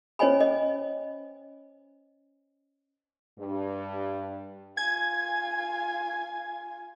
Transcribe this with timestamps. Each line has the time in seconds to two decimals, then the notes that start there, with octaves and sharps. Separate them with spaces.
0.19 C#4 C5 C#5 D#5 G#5 B5
0.40 D#5
3.39 G2
4.77 F4 G#5 G#6